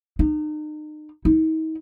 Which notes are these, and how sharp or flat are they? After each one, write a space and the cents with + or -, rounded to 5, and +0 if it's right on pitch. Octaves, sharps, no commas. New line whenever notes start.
D#4 -35
D#4 +40